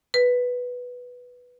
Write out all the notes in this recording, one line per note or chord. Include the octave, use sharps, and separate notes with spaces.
B4